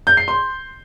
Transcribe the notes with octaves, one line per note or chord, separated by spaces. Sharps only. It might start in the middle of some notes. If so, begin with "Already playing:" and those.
G6
C7
C6